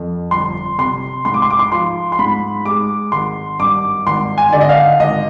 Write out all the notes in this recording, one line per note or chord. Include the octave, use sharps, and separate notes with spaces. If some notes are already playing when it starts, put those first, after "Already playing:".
Already playing: F2
G1 C6
C3 C6
G#2 C6
D6
C6
D6
C6
F3 C6
C6
G#2 B5
G#3 D6
G#1 C6
G2 D6
G#1 C6
G#5
D3 D5
D#5
F5
G#1 D#5